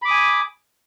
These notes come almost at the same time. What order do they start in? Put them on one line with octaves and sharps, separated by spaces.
B5 D6 D#6 G#5